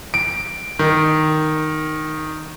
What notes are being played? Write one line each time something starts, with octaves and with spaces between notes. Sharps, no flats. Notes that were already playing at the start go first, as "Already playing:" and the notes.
D7
D#3